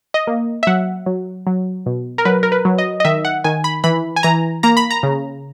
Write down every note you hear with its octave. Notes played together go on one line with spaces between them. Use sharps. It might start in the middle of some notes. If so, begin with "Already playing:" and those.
D#5
A#3
E5
F#3 F#5
F#3
F#3
B2
A#4
F#3 B4
A#4
B4
F#3
D#5
D#5
D#3 E5
F#5
D#3 G#5
B5
E3 B5
G#5
E3 A#5
A#3 A#5
B5
A#5
C#3